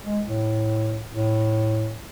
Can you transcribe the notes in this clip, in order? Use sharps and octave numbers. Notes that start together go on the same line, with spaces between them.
G#3
A2
A2